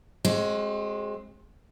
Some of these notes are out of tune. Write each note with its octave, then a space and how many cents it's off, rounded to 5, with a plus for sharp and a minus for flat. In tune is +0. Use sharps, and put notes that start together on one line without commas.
G#3 +10 C4 +35 F#4 +45